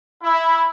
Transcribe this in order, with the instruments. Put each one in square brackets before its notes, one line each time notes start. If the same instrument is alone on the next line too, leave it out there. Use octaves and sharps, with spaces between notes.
[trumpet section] E4